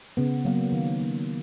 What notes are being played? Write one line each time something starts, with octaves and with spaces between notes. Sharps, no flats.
C#3 B3
F#3 A#3
D#3
A#3